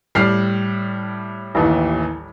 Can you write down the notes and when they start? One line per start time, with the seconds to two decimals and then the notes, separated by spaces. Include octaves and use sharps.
0.15 A2 G3 F6 C7
1.55 A1 D#2 E3